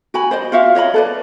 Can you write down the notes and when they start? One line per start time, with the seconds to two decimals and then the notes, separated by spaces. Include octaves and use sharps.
0.14 F#4 G#5 B5
0.31 C5 D5 D#5
0.52 F4 F#4 E5 F5
0.75 C#5 D#5 E5 B5
0.94 A4 B4 D5